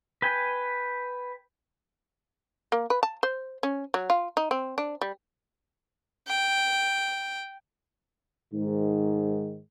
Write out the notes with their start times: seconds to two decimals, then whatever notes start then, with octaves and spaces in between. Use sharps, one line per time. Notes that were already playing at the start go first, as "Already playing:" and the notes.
0.22 B4 G5 G#5
2.72 A#3
2.90 B4
3.03 A5
3.23 C5
3.63 C#4
3.94 F#3
4.10 F4
4.37 D#4
4.51 C4
4.78 D4
5.01 G3
6.28 G5
8.53 G#2 D#3